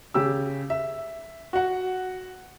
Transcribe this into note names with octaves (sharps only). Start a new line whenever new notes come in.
C#3 G4 E6
E5
F#4 F#5